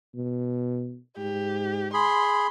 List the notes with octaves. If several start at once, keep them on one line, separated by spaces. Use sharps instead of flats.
B2
G#2 G4
G#4 B5 C6